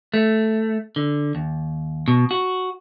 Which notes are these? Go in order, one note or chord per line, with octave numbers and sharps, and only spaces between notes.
A3
D3
D#2
B2
F#4